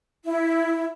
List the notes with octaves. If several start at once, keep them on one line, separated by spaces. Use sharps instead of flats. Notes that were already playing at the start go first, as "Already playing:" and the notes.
E4